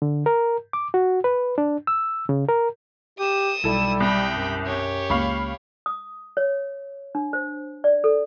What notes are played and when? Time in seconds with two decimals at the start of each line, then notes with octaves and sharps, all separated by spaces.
0.02 D3
0.26 A#4
0.73 D6
0.94 F#4
1.24 B4
1.58 D4
1.87 E6
2.29 C#3
2.48 A#4
3.19 G4 D#6 E7
3.64 B1 G3 E4 A4
4.00 C2 G5 B5
4.33 F#2
4.66 G4 C#5
5.10 C#2 A#3 F5 B5 C#6
5.86 D#6
6.37 C#5
7.15 D4
7.33 C5
7.84 D5
8.04 A4